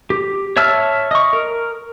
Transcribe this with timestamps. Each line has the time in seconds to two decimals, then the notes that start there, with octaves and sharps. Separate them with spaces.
0.10 G4
0.57 C#5 E5 A5 E6 F6
1.11 D#5 C#6
1.33 A#4